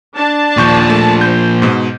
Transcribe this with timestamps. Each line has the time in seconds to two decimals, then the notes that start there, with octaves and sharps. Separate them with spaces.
0.16 D4 A5
0.57 D#2 A#2 F3 C#6 G6
0.90 A3
1.21 C5 G6
1.62 G#2 B2